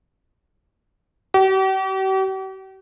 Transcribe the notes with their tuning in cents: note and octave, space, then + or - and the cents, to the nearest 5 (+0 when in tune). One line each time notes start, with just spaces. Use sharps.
G4 -45